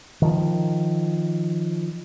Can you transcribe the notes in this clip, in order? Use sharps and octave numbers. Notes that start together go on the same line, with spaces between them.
D#3 F3